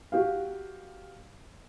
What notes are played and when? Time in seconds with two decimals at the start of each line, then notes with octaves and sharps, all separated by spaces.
0.12 F#4 G4 F5